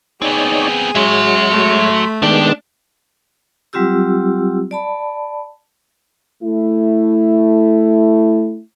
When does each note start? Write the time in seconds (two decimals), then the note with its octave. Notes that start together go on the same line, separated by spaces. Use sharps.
0.22 B3 C4 D#4 G#4 C#5 D5
0.95 F#3 G#3 F#4 C#5 E5 C6
1.51 A3
2.22 C3 D#3 G#3 B3 D4 G4 D5
3.73 F#3 G3 C4 F4 G4 E6
4.71 D5 A5 B5
6.43 A3 E4